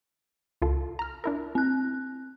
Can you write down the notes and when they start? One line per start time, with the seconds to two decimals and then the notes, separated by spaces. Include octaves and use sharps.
0.62 C#2 F4 A4
0.99 A#5 F6
1.24 D4 E4 A#4
1.55 C4 F#6